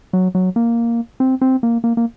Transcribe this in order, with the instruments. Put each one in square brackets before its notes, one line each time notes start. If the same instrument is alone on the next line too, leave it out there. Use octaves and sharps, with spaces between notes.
[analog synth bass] F#3
F#3
A#3
C4
C4
A#3
A#3
A#3